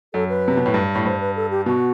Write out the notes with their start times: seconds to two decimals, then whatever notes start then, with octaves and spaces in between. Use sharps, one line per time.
0.14 F#2 A4
0.29 B4
0.48 C3
0.57 B2
0.66 A2
0.74 G2
0.95 A2
1.05 G2 C5
1.20 B4
1.36 A4
1.51 G4
1.66 B2 F#4